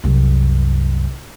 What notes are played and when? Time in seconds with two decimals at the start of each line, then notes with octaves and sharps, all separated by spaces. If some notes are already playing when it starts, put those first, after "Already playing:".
0.04 C2 F#2